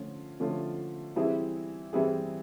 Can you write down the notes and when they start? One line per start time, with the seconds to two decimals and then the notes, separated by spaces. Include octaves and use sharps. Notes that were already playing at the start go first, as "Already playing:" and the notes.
Already playing: D3 F3 A3 C#4 F4
0.40 D3 F3 A3 C#4 F4
1.16 E3 G3 C4 E4 G#4
1.93 E3 G3 C4 E4 G#4